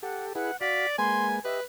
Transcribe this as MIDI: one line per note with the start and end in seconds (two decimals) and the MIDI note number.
0.03 0.33 67
0.03 0.33 69
0.03 0.25 78
0.35 0.51 64
0.35 0.51 68
0.35 0.52 71
0.35 0.57 78
0.61 0.86 66
0.61 0.94 74
0.61 0.86 77
0.61 0.88 95
0.98 1.40 56
0.98 1.40 58
0.98 1.40 71
0.98 1.38 80
0.98 1.27 84
1.45 1.60 67
1.45 1.63 71
1.45 1.60 75
1.45 1.58 76